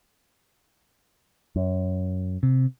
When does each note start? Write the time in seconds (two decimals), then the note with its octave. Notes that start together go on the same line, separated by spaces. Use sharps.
1.56 F#2
2.43 C3